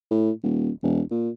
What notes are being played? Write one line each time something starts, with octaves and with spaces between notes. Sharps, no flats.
A2
D#1
E1
A#2